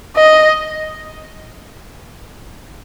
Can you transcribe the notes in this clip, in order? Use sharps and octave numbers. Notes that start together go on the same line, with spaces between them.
D#5